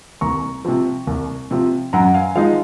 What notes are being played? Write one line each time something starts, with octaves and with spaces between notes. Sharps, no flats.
C2 A#5 C#6
C3 F3
C2
C3 F3
F#2 F#5 A#5
F5 G#5
F3 G#3 D#4 F5